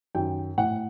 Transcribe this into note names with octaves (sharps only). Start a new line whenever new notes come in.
F#2 D#3 G5
A2 F#5